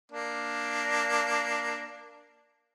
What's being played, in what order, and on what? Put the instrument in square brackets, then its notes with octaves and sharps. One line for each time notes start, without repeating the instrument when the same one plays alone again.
[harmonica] A#3 D4